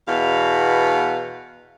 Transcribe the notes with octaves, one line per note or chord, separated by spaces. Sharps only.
E2 B2 F5